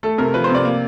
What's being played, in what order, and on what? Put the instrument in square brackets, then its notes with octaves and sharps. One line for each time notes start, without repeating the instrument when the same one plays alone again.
[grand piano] A3 A4
C3 A#4
F3 B4
C5
C3
D5
A#3